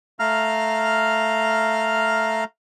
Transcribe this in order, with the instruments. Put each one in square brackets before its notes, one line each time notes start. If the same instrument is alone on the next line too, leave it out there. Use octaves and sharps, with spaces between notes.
[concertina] A3 F5 A#5 F6